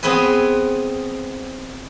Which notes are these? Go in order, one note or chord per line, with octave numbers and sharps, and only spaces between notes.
B3 C4 G#4 B4 G#5